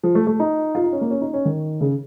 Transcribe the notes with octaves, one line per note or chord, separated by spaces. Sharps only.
F3
A3
A3
D#4
F4
D#4
C#4
A#3
C#4
D#4
C#4
D#3
C#3